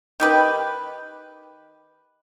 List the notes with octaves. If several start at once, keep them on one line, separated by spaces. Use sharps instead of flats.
D#3 G4 B4